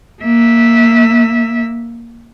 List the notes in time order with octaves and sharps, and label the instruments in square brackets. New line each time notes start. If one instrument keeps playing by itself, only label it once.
[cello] A#3 E5